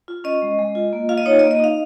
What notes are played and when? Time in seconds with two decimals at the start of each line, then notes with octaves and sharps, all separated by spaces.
0.08 F4
0.24 C#4 D#5
0.42 G#3
0.59 G#3
0.75 F4
0.93 A#3
1.09 F4 F5
1.18 D#5
1.26 D#4 C#5
1.39 D#5
1.44 A#3
1.51 D#5
1.60 D#4 F5